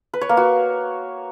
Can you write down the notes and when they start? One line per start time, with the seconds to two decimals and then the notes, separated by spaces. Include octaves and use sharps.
0.13 B4
0.21 C#5
0.29 A#3
0.37 F#4